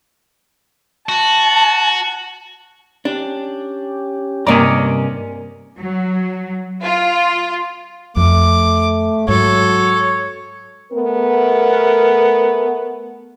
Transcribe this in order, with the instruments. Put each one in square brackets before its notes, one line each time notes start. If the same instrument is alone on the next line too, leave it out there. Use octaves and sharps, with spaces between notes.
[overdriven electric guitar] F#4 [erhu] A5
[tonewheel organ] C#4 G4 [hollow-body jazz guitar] D4
[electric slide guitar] G2 C3 C#4 [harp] A#3 D5 [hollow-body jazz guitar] A#4 D#5 A#5
[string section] F#3
F4
[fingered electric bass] F2 [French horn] A3 [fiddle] D6
[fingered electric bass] G#2 [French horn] F#3 [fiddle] A4 [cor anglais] C#5
[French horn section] A3 B3 A#4